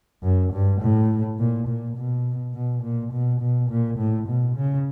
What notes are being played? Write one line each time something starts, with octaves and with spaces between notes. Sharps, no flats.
F#2
G2
A2
A#2
A#2
B2
B2
A#2
B2
B2
A#2
A2
B2
C#3